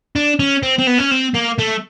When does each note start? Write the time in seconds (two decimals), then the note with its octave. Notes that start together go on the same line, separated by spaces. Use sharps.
0.16 D4
0.39 C#4
0.63 C4
0.78 C4
0.87 B3
0.98 C#4
1.11 C4
1.34 A#3
1.58 A3